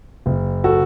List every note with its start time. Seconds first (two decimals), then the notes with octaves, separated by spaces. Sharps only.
0.26 F#1
0.64 F#4 A4